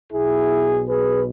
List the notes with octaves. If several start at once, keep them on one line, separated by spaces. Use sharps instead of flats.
B1 B2 E4 G#4
G#4 B4